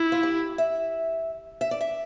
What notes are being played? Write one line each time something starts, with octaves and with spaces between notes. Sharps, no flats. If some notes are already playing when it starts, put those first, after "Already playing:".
Already playing: E4
F4
G4
E5
E5
D5
E5